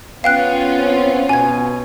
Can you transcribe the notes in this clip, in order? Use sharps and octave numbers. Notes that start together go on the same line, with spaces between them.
B3 C#4 F4 F5 G5 F#6
C4
B2 G#5 G#6